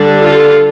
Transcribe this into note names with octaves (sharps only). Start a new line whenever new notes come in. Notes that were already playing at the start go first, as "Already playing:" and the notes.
Already playing: D3 G3 D4
F4 A4